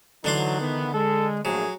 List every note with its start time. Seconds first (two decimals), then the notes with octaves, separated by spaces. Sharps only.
0.24 D3 E3 F#3 D4 D#4 C6
0.59 D#3 E3 B3
0.94 G#3 A4
1.45 A#1 F#3 A3 G#4